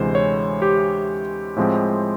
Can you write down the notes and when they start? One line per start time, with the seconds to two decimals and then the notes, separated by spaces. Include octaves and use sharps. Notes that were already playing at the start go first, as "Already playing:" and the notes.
Already playing: D2 C3 E3 G#3 C5
0.15 C#5
0.62 G4
1.57 A2 F3 G#3 C4